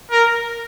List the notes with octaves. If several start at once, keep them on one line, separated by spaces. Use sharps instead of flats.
A#4